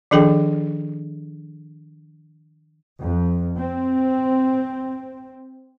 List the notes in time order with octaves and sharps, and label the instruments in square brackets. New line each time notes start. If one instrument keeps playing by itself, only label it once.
[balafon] D#3 F3 D4 G#4 A4 G5
[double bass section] F2
C4